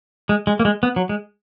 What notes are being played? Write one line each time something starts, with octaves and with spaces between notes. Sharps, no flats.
G#3
G#3
A#3
G#3
B3
F#3
G#3